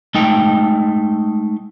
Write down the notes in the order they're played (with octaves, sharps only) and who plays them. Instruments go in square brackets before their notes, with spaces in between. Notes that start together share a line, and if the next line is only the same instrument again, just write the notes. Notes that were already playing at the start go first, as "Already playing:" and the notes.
[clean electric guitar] G#3 A3 D#4 G5